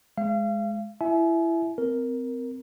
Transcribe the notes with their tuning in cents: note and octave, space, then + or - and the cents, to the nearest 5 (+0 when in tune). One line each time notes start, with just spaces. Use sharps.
G#3 +10 F5 -35
E4 +20 E5 +0 G#5 +35
C4 -25 A#4 +0